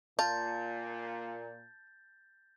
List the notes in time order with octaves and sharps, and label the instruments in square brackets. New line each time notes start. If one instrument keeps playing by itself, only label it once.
[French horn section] A#2 [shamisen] F4 [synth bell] A5 [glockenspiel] G6 A6